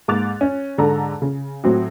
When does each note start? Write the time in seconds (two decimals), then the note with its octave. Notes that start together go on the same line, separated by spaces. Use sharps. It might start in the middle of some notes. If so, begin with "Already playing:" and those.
0.08 G#2 A#3 D6 F#6 A6 F7
0.41 C#4
0.78 G#2 D3 A4 A5 A#5
1.22 C#3
1.64 A2 F#3 C4 F#4